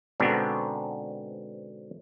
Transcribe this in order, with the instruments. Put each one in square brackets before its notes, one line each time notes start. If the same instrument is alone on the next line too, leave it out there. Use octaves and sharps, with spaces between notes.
[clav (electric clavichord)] G#2 B2 D3 B3 C4 D4